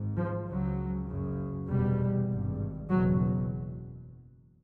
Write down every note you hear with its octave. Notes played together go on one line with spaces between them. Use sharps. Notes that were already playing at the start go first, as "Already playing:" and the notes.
Already playing: G#1 G#2
F3
C#2 C#3 F#3
F#1 F#2 C#3
F1 E2 B2 G3
G#1 G2
F#1 E2 B2 F#3